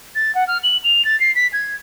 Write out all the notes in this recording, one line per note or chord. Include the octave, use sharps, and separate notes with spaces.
A6
F#5
F6
F#7
F7
A6
C7
B6
G#6